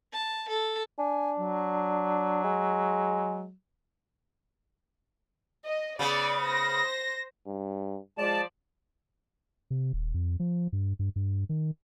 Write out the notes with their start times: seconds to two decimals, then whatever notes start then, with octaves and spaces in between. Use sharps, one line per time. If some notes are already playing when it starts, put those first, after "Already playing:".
0.13 A5
0.48 A4
0.99 D4 G#5
1.39 F#3
2.44 G#3
5.65 D#5
5.99 C#3 B3 D5
6.41 C5 A#6
7.46 G2
8.18 F3 G#3 D5 A5
9.70 C3
9.93 D#1
10.14 F2
10.40 F3
10.72 G2
10.99 G2
11.16 G2
11.49 D#3